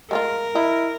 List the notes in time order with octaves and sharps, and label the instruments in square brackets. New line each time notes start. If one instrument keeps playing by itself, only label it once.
[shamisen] G#3 A3 F4 [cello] A#4
[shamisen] D#4 [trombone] E4